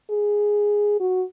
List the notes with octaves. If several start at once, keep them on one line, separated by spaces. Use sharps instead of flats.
G#4
F#4